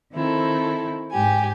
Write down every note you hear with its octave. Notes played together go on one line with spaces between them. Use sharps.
D#3 C4 E4 A4
G#2 G4 G#5